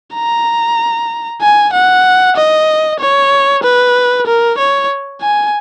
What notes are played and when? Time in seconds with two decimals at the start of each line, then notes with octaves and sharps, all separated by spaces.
0.14 A#5
1.41 G#5
1.73 F#5
2.36 D#5
2.99 C#5
3.63 B4
4.26 A#4
4.58 C#5
5.21 G#5